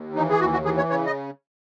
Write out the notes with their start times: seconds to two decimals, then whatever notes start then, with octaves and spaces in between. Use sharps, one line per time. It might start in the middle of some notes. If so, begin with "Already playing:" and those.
Already playing: D#2
0.15 E3 D#4
0.29 G#4
0.40 D#2 F#4
0.53 F#4
0.65 E3 G#4
0.77 C#5
0.89 C#3 C#5
1.06 D#5